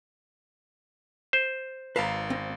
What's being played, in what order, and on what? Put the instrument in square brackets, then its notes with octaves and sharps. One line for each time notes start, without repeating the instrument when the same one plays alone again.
[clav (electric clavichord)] C5
[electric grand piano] G#1 F5 C7 [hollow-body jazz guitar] B4 A5 A#5
[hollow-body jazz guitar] C4